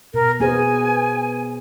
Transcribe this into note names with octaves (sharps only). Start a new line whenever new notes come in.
B2 A#4
B3 G#4 C5 G#5